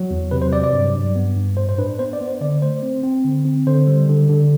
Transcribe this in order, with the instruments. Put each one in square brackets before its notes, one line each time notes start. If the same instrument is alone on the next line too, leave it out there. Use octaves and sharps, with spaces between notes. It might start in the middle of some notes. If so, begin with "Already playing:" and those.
Already playing: [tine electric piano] F#3
E2
C3 B4
C5
F#3 D5
D5
G2
G2
B3
G2
A2 C5
C5
D4 B4
B3 C5
D5
B3
C5
D3 D5
A3 C5
C4
C4
D3
C4
D3 C5
G3
D3
D3